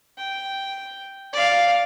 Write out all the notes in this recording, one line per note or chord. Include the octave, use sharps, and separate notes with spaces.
G5
D5 F5